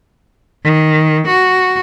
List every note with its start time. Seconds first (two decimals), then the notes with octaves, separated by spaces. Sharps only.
0.63 D#3
1.28 F#4